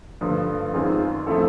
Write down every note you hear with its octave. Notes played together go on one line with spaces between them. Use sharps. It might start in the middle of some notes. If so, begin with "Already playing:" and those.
G2 D3 F3 A3
F#2 D#3 G#3 C4 F4
F3 A3 C4 E4 A4